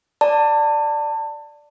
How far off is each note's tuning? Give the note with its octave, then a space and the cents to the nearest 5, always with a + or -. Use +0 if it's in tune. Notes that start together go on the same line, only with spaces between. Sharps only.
D5 +0 A5 +25